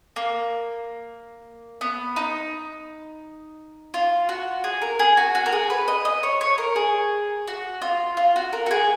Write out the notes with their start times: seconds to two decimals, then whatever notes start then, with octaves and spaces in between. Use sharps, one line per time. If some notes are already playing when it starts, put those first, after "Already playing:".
0.16 A#3
1.81 B3
2.16 D#4
3.94 F4
4.29 F#4
4.64 G#4
4.82 A#4
4.99 G#4
5.17 F#4
5.35 F#4
5.46 A#4
5.53 G#4
5.70 B4
5.88 D#5
6.05 D#5
6.23 C#5
6.41 C#5
6.58 A#4
6.76 G#4
7.47 F#4
7.82 F4
8.17 F4
8.36 F#4
8.53 A#4
8.66 F#4
8.71 G#4